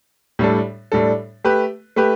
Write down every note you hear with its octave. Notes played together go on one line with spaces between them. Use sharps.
A2 G3 D4 A4
A2 G3 D4 A4
A3 G4 B4
A3 G4 B4